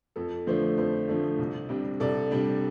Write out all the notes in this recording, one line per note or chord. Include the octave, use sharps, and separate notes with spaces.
F2 A4
D3 F3 A3 D4 C5
F2 C5
D3 F3 A3 D4
C2
C3 G3 D4
C2 A4 D5
C3 G3 D4